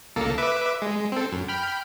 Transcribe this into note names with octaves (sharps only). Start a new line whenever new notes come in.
C#2 A#3 A4
B4 E5 D6
G#3
C4 A4
F#2
G5 B5 F6